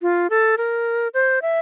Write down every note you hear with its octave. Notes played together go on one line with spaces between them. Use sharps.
F4
A4
A#4
C5
E5